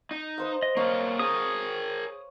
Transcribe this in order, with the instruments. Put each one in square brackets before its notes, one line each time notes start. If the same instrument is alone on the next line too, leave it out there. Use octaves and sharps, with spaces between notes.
[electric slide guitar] D#4
[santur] B4 C5 F5
[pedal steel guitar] D#5
[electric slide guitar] A#3 C#4 [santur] C#5 F5
[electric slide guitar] G#4 A#4 [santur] F5 [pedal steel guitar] D#6